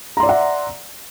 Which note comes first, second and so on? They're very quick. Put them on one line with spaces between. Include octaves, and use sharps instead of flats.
A#5 C6 D5 E5 F#5